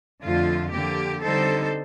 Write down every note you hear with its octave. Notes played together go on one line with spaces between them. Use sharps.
F2 D3 F3 A3 F4
D3 F3 A#3 G4
D3 G3 C4 D#4 A4 C5